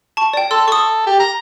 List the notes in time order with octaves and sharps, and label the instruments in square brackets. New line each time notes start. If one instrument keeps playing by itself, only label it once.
[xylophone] A5 C#6
D5 G5
[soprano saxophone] A4 [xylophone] C6 E6
[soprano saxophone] A4 [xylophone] C#6 D#6
[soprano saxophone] G4
A#5